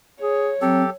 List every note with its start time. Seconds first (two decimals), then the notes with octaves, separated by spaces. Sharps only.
0.22 G#4 C#5
0.61 F#3 C4 G4 A4